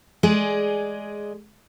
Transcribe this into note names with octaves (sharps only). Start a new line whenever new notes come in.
G#3 G#4 D5